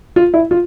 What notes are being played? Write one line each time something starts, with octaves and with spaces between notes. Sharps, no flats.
F4
E4
F4